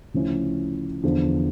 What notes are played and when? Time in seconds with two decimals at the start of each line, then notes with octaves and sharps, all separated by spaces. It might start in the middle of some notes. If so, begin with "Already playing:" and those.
0.14 D2 C#3 F3 C#4 E4
1.03 E2 D3 F3